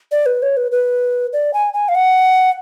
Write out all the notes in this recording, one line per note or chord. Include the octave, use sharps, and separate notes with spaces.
D5
B4
C#5
B4
B4
D5
G#5
G#5
F5
F#5